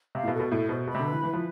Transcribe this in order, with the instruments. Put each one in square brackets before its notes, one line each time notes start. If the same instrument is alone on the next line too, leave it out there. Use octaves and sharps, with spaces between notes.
[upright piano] C3 [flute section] F5
[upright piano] A2
B2
[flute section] A4
[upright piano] B2
[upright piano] A2 [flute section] A4
[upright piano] B2 [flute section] C5
[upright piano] B2 [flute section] B5
[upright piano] C3
D3
[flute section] B4
[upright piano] E3
[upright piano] E3 [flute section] B4
[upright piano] F3